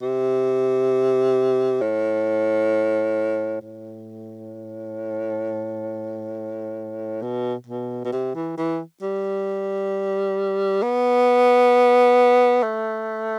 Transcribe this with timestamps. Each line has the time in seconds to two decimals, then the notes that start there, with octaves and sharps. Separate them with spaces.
0.02 C3
1.81 A2
3.61 A2
7.22 B2
7.66 B2
8.05 B2
8.12 C3
8.35 E3
8.57 E3
9.02 G3
10.82 B3
12.63 A3